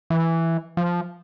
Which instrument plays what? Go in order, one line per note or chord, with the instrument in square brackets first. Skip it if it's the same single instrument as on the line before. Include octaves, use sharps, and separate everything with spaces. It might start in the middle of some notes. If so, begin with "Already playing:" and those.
[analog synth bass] E3
F3